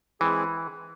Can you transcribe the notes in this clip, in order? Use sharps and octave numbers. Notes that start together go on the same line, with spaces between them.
E3 G#3 C4 E4 G#4